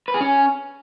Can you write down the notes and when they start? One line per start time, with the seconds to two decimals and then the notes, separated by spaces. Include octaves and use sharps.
0.08 B4
0.14 G#4
0.20 C#4